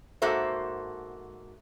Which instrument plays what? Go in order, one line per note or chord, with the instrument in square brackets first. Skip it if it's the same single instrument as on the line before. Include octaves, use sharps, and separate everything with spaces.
[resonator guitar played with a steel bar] G#2 A#3 F#4 A4 C5 E5